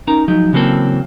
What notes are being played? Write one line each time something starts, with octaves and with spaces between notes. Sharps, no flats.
C#4 D#4 A#4 A#5
F3 F#3 G#3 D#4
C#3 E3 F#3 A#3 C4 A4